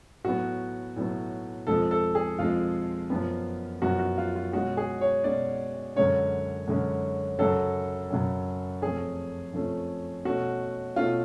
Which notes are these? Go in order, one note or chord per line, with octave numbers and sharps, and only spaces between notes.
A2 F#3 B3 F#4
A2 F#3 B3
F2 F3 G#3 A4
A4
G#4
F2 F3 G#3 F4
F#2 F3 B3
F#2 F3 B3 F#4
F#4
F4
F4
B2 G#3 C#4 F#4
G#4
C#5
B2 G#3 C#4 D5
F#2 D3 G#3 C#4 C#5
F#2 D3 G#3 C#4
F#2 C#3 F#3 A4
F#2 C#3 F#3
F2 F3 A3 C#4 G#4
F2 F3 A3 C#4
B2 A3 C#4 F#4
B2 A3 C#4 F4